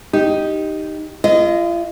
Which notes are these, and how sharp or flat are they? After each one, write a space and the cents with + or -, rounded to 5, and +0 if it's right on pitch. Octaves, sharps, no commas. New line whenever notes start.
D#4 +0 G4 -5
F4 -40 D#5 +0